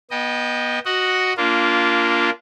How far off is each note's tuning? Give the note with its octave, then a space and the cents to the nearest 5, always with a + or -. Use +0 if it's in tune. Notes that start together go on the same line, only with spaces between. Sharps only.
B3 -25 D#5 -5 G5 +10
F#4 +0 D#5 +0 F#5 +0
A#3 +0 D4 -25 F4 -10